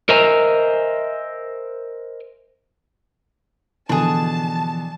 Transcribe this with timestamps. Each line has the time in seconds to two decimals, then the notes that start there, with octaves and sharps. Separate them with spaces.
0.09 A#4 C5 D#5 E5 G#5 A#5
3.89 B2 D3 E3 F3 D4 G#4 A5